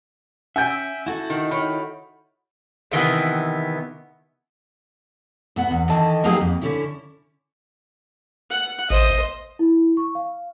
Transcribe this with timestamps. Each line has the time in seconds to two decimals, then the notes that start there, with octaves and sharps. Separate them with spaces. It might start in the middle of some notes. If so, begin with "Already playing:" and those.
0.56 C#4 E5 F#5 G#5 G6 D7
0.71 E6
1.06 E4 F#4 A4
1.30 D#3
1.51 D#3 C#5 B5
2.92 C3 D#3 E3 B3
5.56 E2 B3 F#5
5.71 E2
5.89 D#3 E3 E4 A4 D#5 A5
6.23 F3 F#3 A#3 D#4 G4 G#4
6.41 F2
6.61 D3 C#4 E4
8.50 F#5
8.90 A1 C5 D#5
9.59 E4
9.97 C#6
10.15 F5